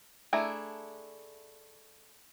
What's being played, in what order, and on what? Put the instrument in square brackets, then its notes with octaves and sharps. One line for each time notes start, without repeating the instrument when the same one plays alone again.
[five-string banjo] A3 D4 E4 G#4 A#5